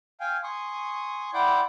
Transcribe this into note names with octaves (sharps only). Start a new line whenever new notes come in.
F5 G5 G#5
G#5 C6 C#6 D#6
E4 D5 F#5 G5 C6 D6